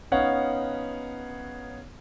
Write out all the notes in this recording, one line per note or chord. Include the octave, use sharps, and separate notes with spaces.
B3 C#4 D#4 C#5 F5 F#5